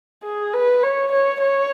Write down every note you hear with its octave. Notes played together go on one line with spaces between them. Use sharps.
G#4
B4
C#5
C#5
C#5